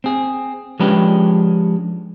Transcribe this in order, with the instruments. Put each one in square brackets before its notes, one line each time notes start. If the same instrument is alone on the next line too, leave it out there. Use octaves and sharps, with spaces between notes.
[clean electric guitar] C4 G#4
F3 G#3 C#4 D4 G4 B4